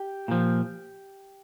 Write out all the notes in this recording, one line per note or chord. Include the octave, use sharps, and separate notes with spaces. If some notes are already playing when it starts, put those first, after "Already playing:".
Already playing: G4
A#2 F3